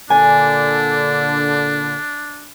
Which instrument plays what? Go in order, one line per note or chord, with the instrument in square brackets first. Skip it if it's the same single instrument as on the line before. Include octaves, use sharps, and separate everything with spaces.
[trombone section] A#2 D3 [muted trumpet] D4 [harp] G#5